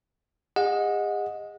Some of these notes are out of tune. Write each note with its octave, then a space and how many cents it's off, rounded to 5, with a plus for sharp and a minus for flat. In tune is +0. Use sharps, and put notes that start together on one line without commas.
G#4 -40 D#5 +0 F#5 -30